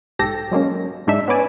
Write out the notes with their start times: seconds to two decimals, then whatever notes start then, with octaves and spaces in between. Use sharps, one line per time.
0.19 B1 G#2 G4 A4 A#6
0.52 F#3 G#3 A#3 C#4
1.07 G#2 G#3 D4 D#4 E5
1.28 B3 C#4 B4 D5 G#5